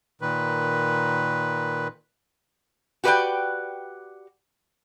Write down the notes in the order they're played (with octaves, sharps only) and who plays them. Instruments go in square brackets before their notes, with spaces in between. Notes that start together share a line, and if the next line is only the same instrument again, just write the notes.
[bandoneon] A#2 D#3 B4
[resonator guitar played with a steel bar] F#4 G4 B4 C#5 D5 G5